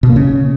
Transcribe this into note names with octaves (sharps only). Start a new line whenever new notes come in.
B2
A#3
C#3